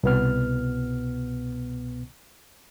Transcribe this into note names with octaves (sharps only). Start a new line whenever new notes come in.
C2 B2 B3 F6